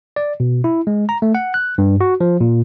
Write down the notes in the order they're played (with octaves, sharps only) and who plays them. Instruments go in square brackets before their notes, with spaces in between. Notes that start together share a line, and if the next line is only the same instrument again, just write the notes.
[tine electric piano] D5
B2
E4
G#3
A#5
A3
F#5
F#6
G2
F#4
F3
A#2